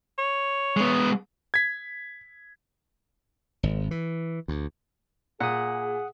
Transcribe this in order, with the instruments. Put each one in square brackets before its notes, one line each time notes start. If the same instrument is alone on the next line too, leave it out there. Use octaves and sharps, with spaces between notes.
[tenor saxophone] C#5
[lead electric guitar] G#3 B3
[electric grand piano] G#6 B6
[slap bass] G#1
E3
D2
[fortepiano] A#2 [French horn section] G#4 [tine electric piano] F#5 D#6